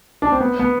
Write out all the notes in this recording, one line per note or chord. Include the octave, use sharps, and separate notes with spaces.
D4
C4
B3
B3